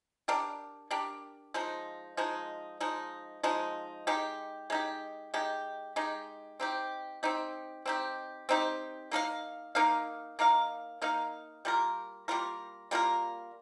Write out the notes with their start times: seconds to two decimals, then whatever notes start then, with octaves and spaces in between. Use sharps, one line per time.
0.28 D4 G4 A#4
0.91 D4 G4 A#4
1.54 F3 G#3 D#4
2.17 F3 G#3 D#4
2.80 F3 G#3 D#4
3.43 F3 G#3 D#4
4.07 G#3 D#4 G4
4.70 G#3 D#4 G4
5.34 G#3 D#4 G4
5.96 G#3 D#4 G4
6.60 C4 D#4 G4
7.23 C4 D#4 G4
7.86 C4 D#4 G4
8.49 C4 D#4 G4
9.12 A#3 D#4 A#4 F5
9.75 A#3 D#4 A#4 F5
10.39 A#3 D#4 A#4 F5
11.02 A#3 D#4 A#4 F5
11.65 G3 A#3 F4 A#4
12.28 G3 A#3 F4 A#4
12.91 G3 A#3 F4 A#4